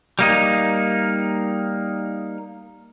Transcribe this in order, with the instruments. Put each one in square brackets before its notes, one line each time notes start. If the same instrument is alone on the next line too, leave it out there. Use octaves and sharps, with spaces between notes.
[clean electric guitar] G3 A#3 D#4